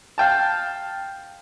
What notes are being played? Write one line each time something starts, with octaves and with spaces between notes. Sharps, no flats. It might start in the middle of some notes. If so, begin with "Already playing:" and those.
F5 G5 A5